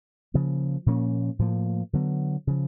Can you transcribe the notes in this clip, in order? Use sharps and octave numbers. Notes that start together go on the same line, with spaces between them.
C#3 F3 A#3
A#2 F3 A#3 C#4
A2 F3 A#3
D3 F#3 B3
C#3 F3